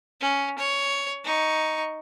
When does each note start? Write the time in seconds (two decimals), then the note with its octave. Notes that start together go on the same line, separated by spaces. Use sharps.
0.20 C#4
0.58 C#5
1.24 D#4 C#6